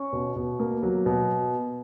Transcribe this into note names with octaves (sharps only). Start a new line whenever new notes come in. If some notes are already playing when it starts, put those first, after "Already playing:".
Already playing: C#4 C#6
B2
B2
A#3
F#3
B2